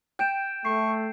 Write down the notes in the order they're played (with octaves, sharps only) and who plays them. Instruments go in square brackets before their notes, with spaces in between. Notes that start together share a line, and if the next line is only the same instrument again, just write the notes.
[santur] G5 [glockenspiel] G6 D7 E7
[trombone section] A3 [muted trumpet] C#6 [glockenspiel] C7